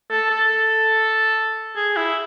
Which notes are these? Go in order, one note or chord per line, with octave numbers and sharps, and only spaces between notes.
A4
A4
G#4
E4